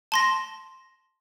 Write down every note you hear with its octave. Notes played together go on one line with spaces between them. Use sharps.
A5 C6 A#6